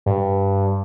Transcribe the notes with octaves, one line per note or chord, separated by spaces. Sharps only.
G2